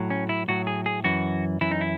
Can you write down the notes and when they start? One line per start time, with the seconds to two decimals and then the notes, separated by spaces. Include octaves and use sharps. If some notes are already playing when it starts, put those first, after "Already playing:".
Already playing: A2 F#3
0.10 C#4
0.29 E4
0.48 A2 F#3 F#4
0.67 G#4
0.86 G#4
1.04 F#2 E3 F#4
1.61 F#2 E3 E4
1.71 D#4
1.81 E4